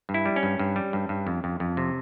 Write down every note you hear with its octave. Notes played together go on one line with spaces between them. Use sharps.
G2
E4
G3
C#4
G2
G2
G3
G2
G2
F2
F2
F2
C3